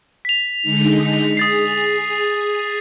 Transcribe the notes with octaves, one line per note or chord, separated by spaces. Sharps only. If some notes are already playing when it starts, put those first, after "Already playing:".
B6 F7
D3 G#3 D#4
G#4 D#6 A6 C7